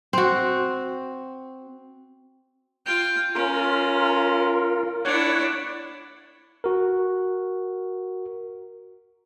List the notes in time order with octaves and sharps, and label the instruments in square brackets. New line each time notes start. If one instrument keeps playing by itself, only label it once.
[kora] C4 F#4
[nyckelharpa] F4 G5
[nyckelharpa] C#4 [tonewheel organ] F4 A#4
[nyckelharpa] D4 E4 [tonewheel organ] C#5 F#5
[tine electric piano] F#4 A#4